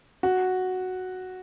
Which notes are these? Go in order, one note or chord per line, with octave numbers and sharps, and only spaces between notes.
F#4